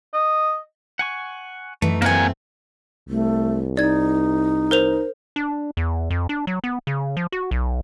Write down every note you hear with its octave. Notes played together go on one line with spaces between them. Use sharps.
D#5
F#5 G#5 C#6
F#2 E3 A3 D#4
A3 A#3 C4 G4 A#4 F#5 G#5
C2 A3
D#4 D5 G#6
A#4 C5 F7
D4
E2
F2
D4
F#3
B3
C#3
F3
F#4
B1